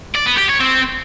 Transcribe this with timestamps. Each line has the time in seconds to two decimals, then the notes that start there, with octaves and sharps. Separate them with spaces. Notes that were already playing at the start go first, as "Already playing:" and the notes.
0.15 D5
0.27 B3
0.38 G4
0.49 C#5
0.61 C4